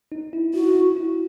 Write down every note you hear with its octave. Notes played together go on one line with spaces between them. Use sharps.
D#4
E4
E4 F#4
E4
E4